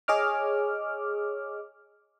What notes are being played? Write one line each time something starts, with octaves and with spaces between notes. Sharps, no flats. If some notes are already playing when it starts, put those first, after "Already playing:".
G#4 C#5 D#5 D6 F6